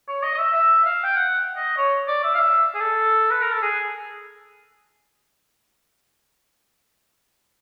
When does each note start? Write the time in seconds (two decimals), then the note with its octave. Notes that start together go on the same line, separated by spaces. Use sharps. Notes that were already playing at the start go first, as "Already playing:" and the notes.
0.08 C#5
0.23 D#5
0.34 D#5
0.38 E5
0.53 E5
0.85 F5
1.04 G5
1.16 F#5
1.56 D#5
1.77 C#5
2.08 D5
2.23 E5
2.34 F5
2.39 E5
2.75 G#4
2.80 A4
3.30 B4
3.41 A#4
3.52 A4
3.62 G#4